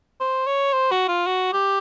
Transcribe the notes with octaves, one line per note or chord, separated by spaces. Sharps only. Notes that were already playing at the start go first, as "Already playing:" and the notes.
C5
C#5
C5
F#4
F4
F#4
G4